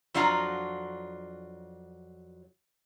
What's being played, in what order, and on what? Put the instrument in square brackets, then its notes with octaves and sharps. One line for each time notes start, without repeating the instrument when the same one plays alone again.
[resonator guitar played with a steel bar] F2 F#3 D4 F4 F#4 A#5